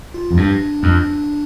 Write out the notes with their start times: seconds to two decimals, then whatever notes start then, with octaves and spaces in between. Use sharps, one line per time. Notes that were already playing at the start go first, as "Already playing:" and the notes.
0.14 F4
0.31 F2
0.37 G2 D4
0.83 F2